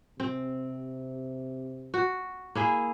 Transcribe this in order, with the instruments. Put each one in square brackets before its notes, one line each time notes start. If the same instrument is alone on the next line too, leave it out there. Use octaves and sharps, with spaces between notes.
[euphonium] C3 [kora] C4
[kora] F#4
A#3 E4 G#4